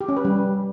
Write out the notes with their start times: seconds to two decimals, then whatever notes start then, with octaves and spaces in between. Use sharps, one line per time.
0.01 G4
0.09 C#4
0.17 B4
0.25 G3